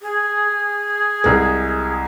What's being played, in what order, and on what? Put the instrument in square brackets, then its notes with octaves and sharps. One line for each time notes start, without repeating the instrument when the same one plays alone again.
[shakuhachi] G#4
[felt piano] C2 G#3